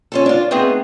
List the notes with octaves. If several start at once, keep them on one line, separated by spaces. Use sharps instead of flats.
C#4 F4 A4
D4 F4
A3 B3 C4 D#4 G#4